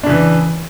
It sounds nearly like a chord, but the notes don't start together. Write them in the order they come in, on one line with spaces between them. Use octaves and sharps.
D4 C#3 E3